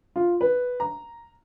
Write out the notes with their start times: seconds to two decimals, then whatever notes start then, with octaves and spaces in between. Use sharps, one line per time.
0.16 F4
0.41 B4
0.80 A#5